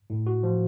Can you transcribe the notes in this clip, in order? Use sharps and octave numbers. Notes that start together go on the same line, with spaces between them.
A2
F#4
F3